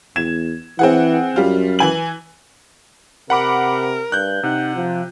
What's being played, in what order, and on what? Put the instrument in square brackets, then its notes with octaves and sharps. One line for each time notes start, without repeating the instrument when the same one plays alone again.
[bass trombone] E2 [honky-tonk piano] G#6 E7
[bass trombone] E3 [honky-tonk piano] C4 G#4 F#5
[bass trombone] F#2 [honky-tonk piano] G3 F4
[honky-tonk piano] E3 G#5 F#7
[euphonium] C3 [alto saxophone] A#4 [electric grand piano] F#5 B5 D6
[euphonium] G2 [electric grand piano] F#6 G6
[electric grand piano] C3 [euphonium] D#4 [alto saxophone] F#5
[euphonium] F3